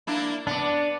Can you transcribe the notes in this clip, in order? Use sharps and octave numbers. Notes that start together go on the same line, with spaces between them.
A#3 D4 E4
B3 D4 D5